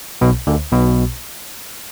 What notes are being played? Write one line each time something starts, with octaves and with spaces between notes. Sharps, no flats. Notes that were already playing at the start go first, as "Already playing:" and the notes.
B1 B2
D2 D3
B1 B2